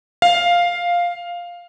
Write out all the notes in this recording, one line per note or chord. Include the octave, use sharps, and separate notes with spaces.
F5